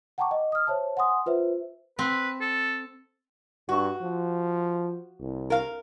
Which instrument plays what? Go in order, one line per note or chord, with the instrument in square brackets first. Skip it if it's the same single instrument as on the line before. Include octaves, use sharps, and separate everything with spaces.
[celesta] F#5 G5 A5 A#5 C#6 D6
D#5
D#6 F6
C5 C#5 E5 A5
F#5 G#5 C6 D#6
F4 B4 C5 E5
[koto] C4 [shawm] B4
[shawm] A4
[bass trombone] G2 [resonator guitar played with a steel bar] F#4
[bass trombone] F3
C2
[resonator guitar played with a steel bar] A#4 F5